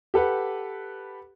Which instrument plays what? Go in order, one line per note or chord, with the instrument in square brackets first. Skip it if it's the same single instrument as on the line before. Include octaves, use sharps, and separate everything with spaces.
[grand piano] G4 A4 B4 F#5